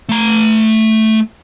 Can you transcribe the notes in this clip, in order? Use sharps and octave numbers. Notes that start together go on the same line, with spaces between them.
A3 A#5